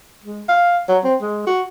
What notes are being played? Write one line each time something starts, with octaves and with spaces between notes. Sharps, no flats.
G#3
F5
F#3
C4
G#3
F#4